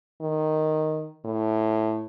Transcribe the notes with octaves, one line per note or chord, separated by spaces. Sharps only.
D#3
A2